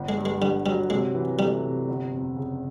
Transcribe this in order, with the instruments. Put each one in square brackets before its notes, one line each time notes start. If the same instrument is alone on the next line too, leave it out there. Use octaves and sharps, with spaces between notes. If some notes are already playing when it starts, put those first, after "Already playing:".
Already playing: [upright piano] G1
[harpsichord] G#3
[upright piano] G2
[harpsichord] G#3
[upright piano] D3 [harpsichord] G3
[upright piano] F#3 [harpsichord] G3
[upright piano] C3 [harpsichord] G#3
[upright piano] E3
[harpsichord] G3 [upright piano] A3
[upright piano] C3
G1
F2
C#3